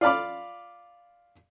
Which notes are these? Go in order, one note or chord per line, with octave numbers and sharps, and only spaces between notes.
F4 D5 F5 B5 D6